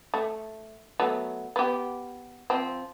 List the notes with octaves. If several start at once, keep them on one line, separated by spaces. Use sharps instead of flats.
A3
F#3 A3 B3
B3 G4
F3 C4